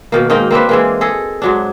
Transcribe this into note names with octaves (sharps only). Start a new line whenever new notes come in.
B2 D#3 A#3
G#2 A#3 D#4 G5
A#3 C4 D4 B4
E3 G#3 A#3
G#4 A4 D#5
G#2 F#3 D4